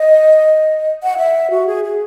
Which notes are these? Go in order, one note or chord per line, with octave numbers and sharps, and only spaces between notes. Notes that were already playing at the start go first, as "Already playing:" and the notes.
Already playing: D#5
F#5
E5
F#4
G#4
G#4